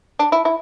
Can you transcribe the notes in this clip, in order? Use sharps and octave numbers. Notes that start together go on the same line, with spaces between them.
D4
E4
E4